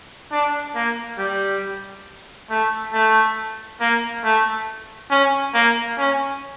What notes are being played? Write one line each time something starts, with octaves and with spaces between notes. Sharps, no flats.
D4
A#3
G3
A3
A3
A#3
A3
C#4
A#3
C#4